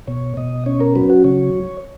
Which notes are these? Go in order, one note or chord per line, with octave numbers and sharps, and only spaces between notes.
B2 C#5
B2 D#5
C#4 C#5
A#4
F#3 B4
F#4
C#3 C#5